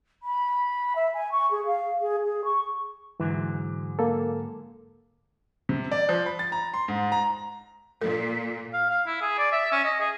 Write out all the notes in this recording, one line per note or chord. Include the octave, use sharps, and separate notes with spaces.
B5
E5
G#5
C#6
G#4
F5
G#4
G#4
C#6
G#2 D3 E3 F#3
A#3 A4
C3
D5
F3
B5
A6
A#5
C6
G#2
A#5
A#2 A4
F5
F5
E4
G#4
D5
E5
C#4
D#5
G#4